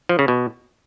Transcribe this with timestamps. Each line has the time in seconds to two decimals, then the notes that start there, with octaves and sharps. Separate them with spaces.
0.09 F3
0.19 C#3
0.28 B2